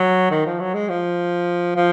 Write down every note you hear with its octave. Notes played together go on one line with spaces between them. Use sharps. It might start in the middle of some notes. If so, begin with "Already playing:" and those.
Already playing: F#3
D#3
F3
F#3
G#3
F3
F3